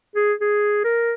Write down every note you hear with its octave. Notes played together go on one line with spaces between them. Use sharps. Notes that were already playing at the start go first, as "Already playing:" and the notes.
G#4
G#4
A#4